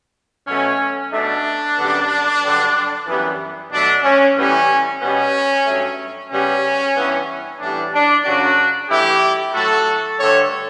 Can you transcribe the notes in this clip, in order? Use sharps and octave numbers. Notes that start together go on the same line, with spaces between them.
B2 F#3 A3 C#4
B2 A3 D4
F#2 D3 G3 B3
G2 D3 F#3
F#2 E3 G3 B3
B2 F#3 A3 D4
C#4
A2 E3 G3 B3 C#4
B2 G3 B3 C#4
G2 F#3 A3
C#3 G3 B3 C#4
G2 E3 B3
A2 E3 G3 B3 D4
D4
F#2 C#3 F#3 D4 F#4
G2 E3 A3 E4 G4
A2 F#3 A3 F#4 A4
G2 D3 A3 A4 C#5